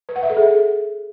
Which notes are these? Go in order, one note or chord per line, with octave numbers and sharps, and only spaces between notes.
B4
F#5
E5
A4
G#4